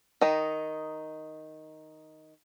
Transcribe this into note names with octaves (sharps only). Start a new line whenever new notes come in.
D#3 D#4